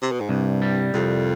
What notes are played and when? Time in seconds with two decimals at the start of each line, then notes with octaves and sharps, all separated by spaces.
0.02 C3
0.12 B2
0.20 G#2
0.29 C2 G2
0.62 G3
0.94 C2 F2